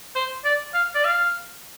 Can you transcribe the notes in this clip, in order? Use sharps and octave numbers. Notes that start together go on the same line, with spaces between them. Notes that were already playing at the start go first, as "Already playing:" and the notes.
C5
D5
F5
D5
F5